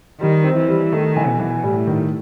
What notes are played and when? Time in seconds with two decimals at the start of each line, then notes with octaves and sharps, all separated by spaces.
0.21 D#3 G3
0.44 C4
0.57 E3
0.68 G3
0.92 D#3 A3
1.16 E3
1.28 B2
1.40 E3
1.63 A2 G3
1.87 D#3